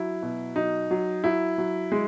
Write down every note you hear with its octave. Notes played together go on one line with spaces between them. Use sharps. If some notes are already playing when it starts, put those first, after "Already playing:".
Already playing: F#3 E4
B2
F#3 D#4
F#3
F#3 E4
F#3
G#3